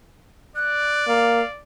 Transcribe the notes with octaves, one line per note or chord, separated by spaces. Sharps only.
D5 F#6
A#3 F5